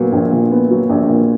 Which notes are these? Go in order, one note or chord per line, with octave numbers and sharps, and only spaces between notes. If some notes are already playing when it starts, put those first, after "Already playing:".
Already playing: A#2 F#3 B3
A#1
A#2
B3
F#3
A#1
A#2